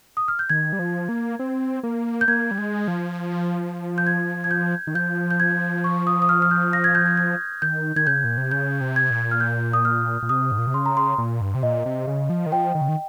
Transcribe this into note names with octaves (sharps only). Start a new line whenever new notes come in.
D#6
F6
G6
D#3 G#6
G3
F3
A#3
C4
A#3
G6
A#3 G#6
G3
G#3
F3
G6
G#6
G#6
G6
D#3
F3 G6
G6
G#6
C#6
D#6
D#6
F6
F6
G6
A#6
G#6
G6
G#6
G#6
D#3 G6
D#3 G#6
C#3 G6
A#2
C3
C#3 G6
C3
G#6
A#2
F6
G6
D#6
F6
A#2
C3 D#6
G#2
A#2
C3
C#3 C6
A#5
C6
A#2
G2
C3
A#2 D#5
C3
C#3
F3
D#3
F3 G5
D#3
C#3
D#3